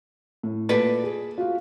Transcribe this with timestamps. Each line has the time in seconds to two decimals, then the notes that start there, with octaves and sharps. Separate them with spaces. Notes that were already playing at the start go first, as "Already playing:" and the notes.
0.43 A2
0.69 A#2 A4 B4 D5 A5
1.04 G#4
1.38 F4 F#4 F5